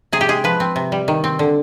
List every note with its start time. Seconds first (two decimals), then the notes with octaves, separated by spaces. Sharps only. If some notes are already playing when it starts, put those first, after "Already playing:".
0.12 C3 G#4
0.21 G4
0.29 G#3 G#4
0.44 F3 B4
0.60 C4
0.76 C3
0.92 G3
1.08 D#3
1.24 C4
1.39 D3